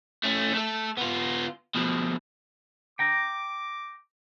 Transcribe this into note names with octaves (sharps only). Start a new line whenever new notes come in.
A3 C#4
A3 A4
B3 F4
B2 F3
G5 A#5 D6